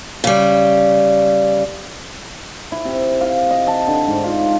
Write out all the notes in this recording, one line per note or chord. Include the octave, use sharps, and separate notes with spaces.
C#3 G3
E4
C3
F5
D#5
A5
D3
G#2
F4